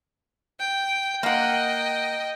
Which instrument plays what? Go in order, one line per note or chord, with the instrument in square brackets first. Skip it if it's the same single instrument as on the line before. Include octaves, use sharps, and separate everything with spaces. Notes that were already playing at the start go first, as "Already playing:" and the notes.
[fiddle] G5
[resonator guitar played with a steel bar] A#3 F#5 [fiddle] D#5 G5